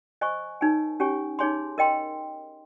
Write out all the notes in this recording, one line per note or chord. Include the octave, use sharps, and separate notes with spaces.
C5 D#5 G#5 C#6
D#4 A#4 C#5 G#5
C#4 G4 C#5 G#5 C#6
D#4 G#4 C#5 G#5 C6
A#4 D#5 G5 C6